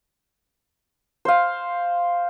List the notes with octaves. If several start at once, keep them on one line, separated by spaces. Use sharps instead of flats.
C5 F5